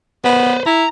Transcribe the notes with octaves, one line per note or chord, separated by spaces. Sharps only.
B3 B4 C5
E4 A#5